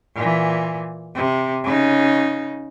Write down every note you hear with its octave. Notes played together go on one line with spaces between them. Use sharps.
A#2 E3
C3
C#3 D#4